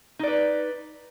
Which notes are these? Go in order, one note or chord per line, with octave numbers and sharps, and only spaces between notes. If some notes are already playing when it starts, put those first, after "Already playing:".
D#4 B4 D5